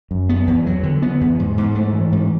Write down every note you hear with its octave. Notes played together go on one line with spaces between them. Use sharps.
F#2
B3
E2
F#3
D3
B3
E2
G#2
G#2
A3
E3
G#2